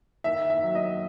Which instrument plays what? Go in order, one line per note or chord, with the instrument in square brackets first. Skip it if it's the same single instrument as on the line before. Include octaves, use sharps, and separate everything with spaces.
[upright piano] D#3 E5
E5
F#3
D#5